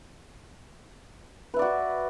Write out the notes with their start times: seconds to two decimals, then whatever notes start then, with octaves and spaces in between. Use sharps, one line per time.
1.54 B4
1.56 E5
1.59 D5
1.62 F#4